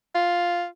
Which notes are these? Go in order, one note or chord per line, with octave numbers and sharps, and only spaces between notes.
F4